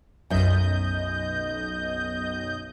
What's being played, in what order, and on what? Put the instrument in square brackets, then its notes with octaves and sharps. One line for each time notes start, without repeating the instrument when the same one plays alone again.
[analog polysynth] B1 D#5 G6 [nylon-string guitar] F#2 E5